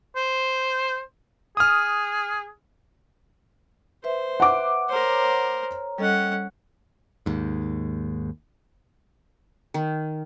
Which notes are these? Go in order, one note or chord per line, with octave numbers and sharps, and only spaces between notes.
C5
G#4 D#6 F6
B4 C5 E5
F#5 D6
A#4 C5 C#5 A#5
G3 C#4 A4 D#5 F#5
D#2 G#2
D#3